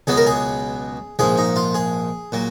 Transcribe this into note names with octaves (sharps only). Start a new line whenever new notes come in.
C#2 B2 F#3 B3 G#4
A#4
G#4
A#1 G#2 F3 G#4
D#4
F4
G#4
A#2 F#3